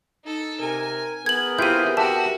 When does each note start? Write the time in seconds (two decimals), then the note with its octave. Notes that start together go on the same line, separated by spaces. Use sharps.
0.24 D#4 A4
0.61 C3 A#4 G#5
1.26 B3 G#4 A#4 G#6 F#7
1.59 C4 E4 F4 G4 G6 D#7
1.97 F#4 G4 E5 G5 A5